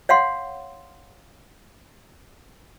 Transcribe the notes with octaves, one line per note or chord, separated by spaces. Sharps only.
C#5 F5 F#5 C6